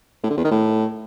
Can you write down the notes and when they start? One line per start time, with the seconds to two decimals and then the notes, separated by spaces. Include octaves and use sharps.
0.23 A2
0.30 D3
0.37 E2
0.44 D#3
0.51 A2